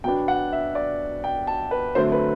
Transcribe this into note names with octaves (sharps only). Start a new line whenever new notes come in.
B2 F#3 B3 D4 G5
F#5
E5
D5
G5
A5
B4
D3 F#3 A3 C4 C5
B4